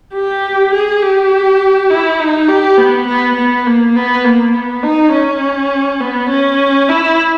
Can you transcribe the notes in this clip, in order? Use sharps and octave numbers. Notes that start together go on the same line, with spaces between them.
G4
G#4
G4
E4
D#4
G4
B3
B3
B3
A#3
B3
A#3
B3
D#4
C#4
B3
C#4
E4